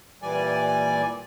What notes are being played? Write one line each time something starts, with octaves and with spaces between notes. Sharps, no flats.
A#2 E3 G3 D5 G#5